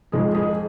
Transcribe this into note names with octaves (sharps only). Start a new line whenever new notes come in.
F2 D#3 G#3 G#4
G#3 G#4